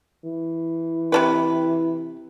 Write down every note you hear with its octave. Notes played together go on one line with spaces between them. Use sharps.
E3
C3 F3 B4